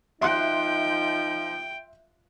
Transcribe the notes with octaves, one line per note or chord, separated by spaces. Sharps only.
F3 D#4 E5 G5 C6 F#6